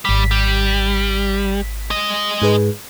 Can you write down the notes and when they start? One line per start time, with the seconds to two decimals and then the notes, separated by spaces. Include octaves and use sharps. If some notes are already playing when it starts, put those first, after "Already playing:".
0.05 G#1 G3 B6
0.31 G3
1.91 G#3 D#5
2.42 G#2 G#4 B4